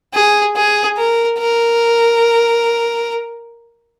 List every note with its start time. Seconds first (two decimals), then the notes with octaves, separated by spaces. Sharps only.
0.14 G#4
0.56 G#4
0.97 A#4
1.38 A#4